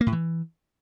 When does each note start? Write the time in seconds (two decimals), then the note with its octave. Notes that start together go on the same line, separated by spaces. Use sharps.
0.01 A#3
0.07 A2
0.12 E3